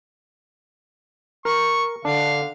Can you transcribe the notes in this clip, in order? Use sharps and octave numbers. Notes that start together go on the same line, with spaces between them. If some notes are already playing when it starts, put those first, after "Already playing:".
A#4 C#6
D3 D4 F5